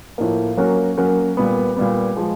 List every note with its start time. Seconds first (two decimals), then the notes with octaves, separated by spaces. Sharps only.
0.18 A2 F3 A#3
0.57 F#3 A#3 C#4 F#4 A#4
0.97 F#3 A#3 C#4 F#4 A#4
1.37 A#2 G3 B3
1.76 A#2 G3 B3
2.16 F3 G#3